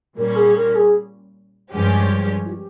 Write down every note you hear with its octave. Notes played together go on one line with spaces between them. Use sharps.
A#2 G3 C#4 A#4
G#4
A#4
G#4
G2 F3 G#3 C#4 G4
F4
G4